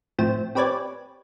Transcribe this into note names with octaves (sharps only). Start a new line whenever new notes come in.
A2 F3 C4 E7
C4 G4 B4 C#5 D5 G#5